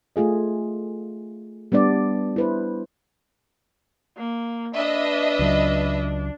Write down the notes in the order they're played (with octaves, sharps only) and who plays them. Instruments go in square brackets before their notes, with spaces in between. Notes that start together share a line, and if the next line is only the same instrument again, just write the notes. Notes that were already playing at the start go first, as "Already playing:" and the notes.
[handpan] A3 F4 G#4 D#5
G3 B3 D4 D5
E4 B4 C5
[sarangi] A#3
[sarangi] D4 [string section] B4 D#5 E5
[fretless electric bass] C#2 F#3